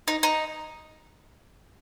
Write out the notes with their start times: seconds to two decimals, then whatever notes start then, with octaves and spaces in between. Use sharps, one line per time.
0.08 D#4
0.23 D#4